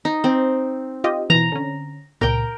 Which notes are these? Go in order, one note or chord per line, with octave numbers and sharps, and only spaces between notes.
D#4
C4
F4 G4 D#5
B2 E3 A#5
D3 C#4
C#2 A#2 A#4 G5